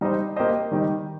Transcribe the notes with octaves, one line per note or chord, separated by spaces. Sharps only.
G3 D#4 G4 C5 D#5
A#3 G4 C5 D#5
D#3 G3 D#4 G4